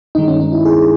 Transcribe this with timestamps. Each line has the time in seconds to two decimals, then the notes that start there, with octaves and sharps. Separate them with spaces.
0.15 G2 D#3 G#3 D#4
0.28 C#4
0.41 D#4
0.53 E4
0.65 G#4